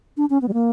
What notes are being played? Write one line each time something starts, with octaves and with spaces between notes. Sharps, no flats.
D4
C#4
B3
G3
A#3